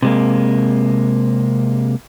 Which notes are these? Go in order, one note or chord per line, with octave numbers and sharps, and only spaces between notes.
C3 G#3 A#3